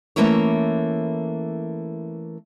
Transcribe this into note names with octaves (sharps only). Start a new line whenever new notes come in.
E3 A3 A#3 C#4 E4 C#5